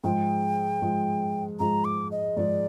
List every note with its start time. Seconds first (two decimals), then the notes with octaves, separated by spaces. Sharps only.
0.04 G#2 F3 G#3 G5
0.82 G#2 F3 G#3
1.59 G#2 F3 G#3 A#5
1.85 D6
2.12 D#5
2.37 G#2 F3 G#3 D5